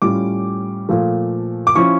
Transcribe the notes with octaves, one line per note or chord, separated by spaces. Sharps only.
A2 G3 C#4 F4 D6
A#2 F3 A3
D6
F3 C#4 E4 C#6